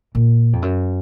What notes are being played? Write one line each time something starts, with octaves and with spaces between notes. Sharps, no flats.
A#2
F2
F#2